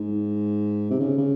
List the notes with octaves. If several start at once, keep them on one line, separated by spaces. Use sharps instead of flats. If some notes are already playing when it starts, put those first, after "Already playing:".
Already playing: G#2
C3
C#3
C#3